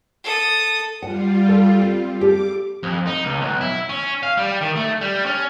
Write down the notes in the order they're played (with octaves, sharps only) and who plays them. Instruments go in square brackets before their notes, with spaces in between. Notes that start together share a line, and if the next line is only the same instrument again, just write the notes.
[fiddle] A4 D#6
[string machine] G3 F4 [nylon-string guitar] F#5
[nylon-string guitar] A4
C4
[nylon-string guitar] G4 A4 [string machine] D6
[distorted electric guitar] F2
D#4
C#2
B1
E4
C#4
F5
G3
D#3
A3
G3
C#4